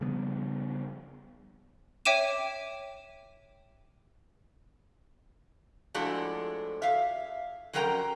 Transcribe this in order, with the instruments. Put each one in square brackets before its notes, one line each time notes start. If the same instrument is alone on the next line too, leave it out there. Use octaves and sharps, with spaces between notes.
[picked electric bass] C#3 F3 G3 B3
[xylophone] C#5 E5 G5 D6 D#7 E7
[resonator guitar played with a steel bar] A2 F3 G#3 D4 F#4 A4
E5 F5
F2 F#3 C#4 A#4 G5 A#5